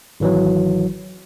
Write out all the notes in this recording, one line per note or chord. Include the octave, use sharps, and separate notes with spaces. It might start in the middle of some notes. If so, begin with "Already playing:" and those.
G#1 E3 F#3